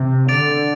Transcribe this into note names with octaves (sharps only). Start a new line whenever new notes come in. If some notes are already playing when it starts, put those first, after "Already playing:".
Already playing: C3
D3 D6 A6 D7 F7